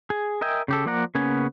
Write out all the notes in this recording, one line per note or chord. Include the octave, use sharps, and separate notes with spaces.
G#4
A#4 D#5 E5 G5 G#5
C#3 G4 A4
F3 A#3 D5 F#5 A#5
C#3 A#3 B3 C#4 G#5